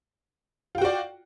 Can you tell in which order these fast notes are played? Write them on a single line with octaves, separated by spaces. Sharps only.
F4 G5 F#4 D5